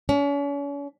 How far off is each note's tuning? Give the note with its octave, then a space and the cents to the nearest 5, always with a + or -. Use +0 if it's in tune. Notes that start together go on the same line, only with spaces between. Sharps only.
C#4 +40